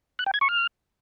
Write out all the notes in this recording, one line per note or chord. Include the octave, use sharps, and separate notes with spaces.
F#6
G5
G#6
C#6
F6